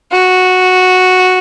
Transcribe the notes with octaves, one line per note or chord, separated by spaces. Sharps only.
F#4